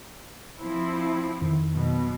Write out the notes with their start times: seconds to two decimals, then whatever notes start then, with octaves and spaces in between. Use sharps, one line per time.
0.59 F3 C4 E4
1.41 F2 D#3
1.72 B2 F#3